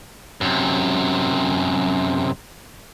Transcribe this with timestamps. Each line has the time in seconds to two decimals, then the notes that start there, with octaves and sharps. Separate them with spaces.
0.41 F#2 C3